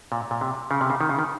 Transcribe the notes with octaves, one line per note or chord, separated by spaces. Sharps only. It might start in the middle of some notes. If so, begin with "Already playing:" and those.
A#2
A#2
C3
C#3
C3
C#3
D#3
C#3
D#3